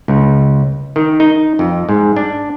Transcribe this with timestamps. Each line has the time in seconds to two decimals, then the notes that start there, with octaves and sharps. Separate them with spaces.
0.08 C#2
0.96 D#3
1.20 D#4
1.59 F2
1.89 G#2
2.16 D4